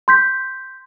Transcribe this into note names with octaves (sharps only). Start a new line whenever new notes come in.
C6 G6 B6